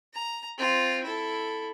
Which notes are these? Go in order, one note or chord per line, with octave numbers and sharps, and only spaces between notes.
A#5
C4 F4
E4 A4